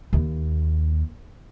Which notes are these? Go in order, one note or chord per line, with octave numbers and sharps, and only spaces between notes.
D#2